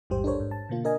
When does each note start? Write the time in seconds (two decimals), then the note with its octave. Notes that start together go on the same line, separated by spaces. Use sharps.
0.10 A1 E2 G#2 G3 G4 C5
0.24 D4 G4 A4 A#4 C5 C#5
0.40 G#2
0.51 A5
0.69 B2 D3 A#3 F4
0.84 D4 A#4 D#5 G#5